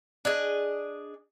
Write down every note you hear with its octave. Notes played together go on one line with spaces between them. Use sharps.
D4 G#4 D#5